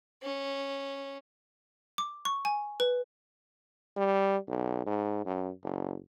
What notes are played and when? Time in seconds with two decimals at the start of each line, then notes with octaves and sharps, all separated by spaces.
0.23 C#4
1.98 D6
2.25 C#6
2.45 G#5
2.80 B4
3.97 G3
4.48 B1
4.86 G#2
5.26 F#2
5.63 F#1